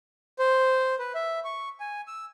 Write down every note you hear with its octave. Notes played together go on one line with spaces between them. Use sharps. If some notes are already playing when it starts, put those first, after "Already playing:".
C5
B4
E5
C#6
G#5
E6